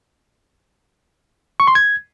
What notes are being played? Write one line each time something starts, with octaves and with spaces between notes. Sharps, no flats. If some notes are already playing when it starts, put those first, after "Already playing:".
C#6
C6
G#6